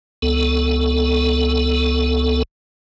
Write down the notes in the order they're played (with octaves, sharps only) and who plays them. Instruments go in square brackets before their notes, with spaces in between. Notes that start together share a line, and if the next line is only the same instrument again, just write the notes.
[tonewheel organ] C#2 B3 A4